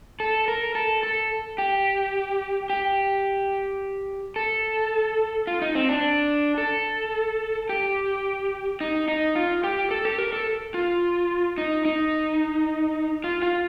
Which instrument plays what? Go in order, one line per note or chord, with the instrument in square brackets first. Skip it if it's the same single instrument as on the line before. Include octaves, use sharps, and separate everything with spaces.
[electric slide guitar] A4
A#4
A4
A4
G4
G4
A4
F4
D#4
C4
D4
A4
G4
D#4
D#4
F4
G4
A4
G4
A#4
A4
F4
D#4
D#4
F4
F4